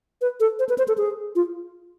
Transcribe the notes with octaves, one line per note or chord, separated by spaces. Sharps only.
B4
A4
C5
B4
C5
A4
G#4
F4